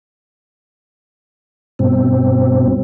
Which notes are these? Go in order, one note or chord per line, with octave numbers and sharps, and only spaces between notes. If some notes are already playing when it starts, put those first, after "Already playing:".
G2 B2 C4